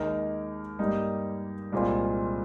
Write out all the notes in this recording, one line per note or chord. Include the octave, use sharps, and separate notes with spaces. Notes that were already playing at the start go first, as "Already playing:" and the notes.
Already playing: D#2 D#3 G#3 D#4 A#4
G2 G3 A#3 D#4
C2 A#2 G#3 C4 F4